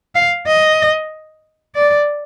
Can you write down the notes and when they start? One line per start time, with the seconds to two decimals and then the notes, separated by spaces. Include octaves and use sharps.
0.15 F5
0.47 D#5
1.75 D5